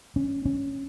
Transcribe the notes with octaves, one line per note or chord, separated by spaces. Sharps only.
C#4
C#4